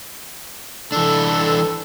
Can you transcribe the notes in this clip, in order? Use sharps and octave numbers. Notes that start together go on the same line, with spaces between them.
E3 D4 A4